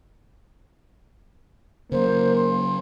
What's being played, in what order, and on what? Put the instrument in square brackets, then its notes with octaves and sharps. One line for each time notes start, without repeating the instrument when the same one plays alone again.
[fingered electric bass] C#3 F#3 [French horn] A#3 [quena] C5
[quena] C6